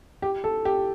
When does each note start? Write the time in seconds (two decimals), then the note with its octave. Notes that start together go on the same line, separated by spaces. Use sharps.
0.22 G4
0.44 A4
0.65 G4